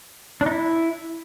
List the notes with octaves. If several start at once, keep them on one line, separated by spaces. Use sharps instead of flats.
D4
D#4
E4